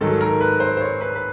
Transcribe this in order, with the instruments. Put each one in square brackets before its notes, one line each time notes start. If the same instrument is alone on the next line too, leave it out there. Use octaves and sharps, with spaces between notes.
[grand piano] G#2 D#3 F#3 A4
A#4
B4
C5
C5
C#5
B4
B4